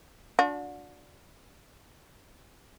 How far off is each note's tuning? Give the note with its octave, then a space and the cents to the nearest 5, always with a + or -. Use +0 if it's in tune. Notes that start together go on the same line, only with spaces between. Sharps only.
D4 -10 F#4 -40